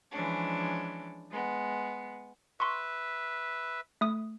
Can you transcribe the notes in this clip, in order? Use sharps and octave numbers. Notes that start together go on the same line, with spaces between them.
E3 F3 G#3 C#4 D4
G#3 B3
B4 E5 C6 C#6
A3 D#6